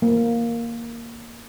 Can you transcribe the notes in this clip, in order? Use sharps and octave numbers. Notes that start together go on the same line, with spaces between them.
A#3